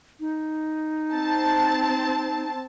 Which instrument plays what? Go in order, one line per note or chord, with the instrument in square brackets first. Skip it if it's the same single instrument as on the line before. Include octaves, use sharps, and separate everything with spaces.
[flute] D#4
[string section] C4 A5